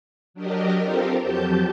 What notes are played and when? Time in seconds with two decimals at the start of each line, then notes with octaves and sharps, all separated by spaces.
0.34 F#3 D4 G4 A#4 D#5
0.82 C4 F4 G4 A4 A#4 C5
1.19 F2 F#3 G4 A5 G6